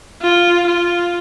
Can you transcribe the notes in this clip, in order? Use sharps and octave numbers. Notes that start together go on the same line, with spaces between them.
F4
F4